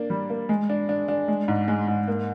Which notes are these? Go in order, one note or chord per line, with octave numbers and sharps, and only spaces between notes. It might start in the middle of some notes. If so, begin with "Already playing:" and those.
Already playing: A#3 D4
G3
A#3
G#3
D4
D4
D4
G#3
G#2
G#3
G#2
A#3